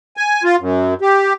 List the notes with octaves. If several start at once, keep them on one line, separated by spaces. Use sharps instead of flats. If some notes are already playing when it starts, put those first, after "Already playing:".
G#5
F4
F#2
G4